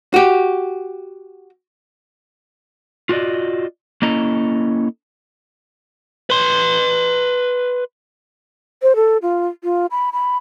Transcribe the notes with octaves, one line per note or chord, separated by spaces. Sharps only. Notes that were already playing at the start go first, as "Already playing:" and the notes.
F#4 G4
F4 F#4 A#4 D5 D#5
A#3 C#4 E4 A4 D#5 A#5
B4 C6
C5
A4
F4
F4
B5
B5